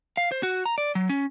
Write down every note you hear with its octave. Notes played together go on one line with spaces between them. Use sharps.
F5
C5
F#4
A#5
D5
F#3
C#4